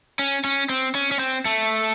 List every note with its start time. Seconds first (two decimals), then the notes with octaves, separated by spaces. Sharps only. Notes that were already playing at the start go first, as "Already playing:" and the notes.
0.19 C#4
0.44 C#4
0.70 C4
0.95 C#4
1.12 C#4
1.20 C4
1.46 A3